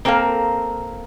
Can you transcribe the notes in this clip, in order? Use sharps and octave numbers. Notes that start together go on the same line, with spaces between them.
A#3 C4 A4 A#4 F5